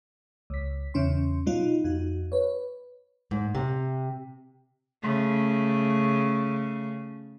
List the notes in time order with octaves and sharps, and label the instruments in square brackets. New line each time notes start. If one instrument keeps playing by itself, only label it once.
[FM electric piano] C#2 B6
E2 C#3 C#4 C6
B2 F#3 D#4 F4
F2 D#4 F#4
B4 C#5
[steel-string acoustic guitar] G#2
C3
[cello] C#3 A3